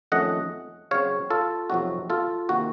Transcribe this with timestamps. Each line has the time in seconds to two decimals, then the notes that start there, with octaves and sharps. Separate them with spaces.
0.12 F2 D#3 A3 C#4 D#5 F#5
0.91 C#3 F#3 C4 C#5 F5
1.30 F4 A4
1.70 F2 C3 F#3 C4 D#4 F#4
2.10 F4 A4
2.49 C3 D#3 A#3 F#4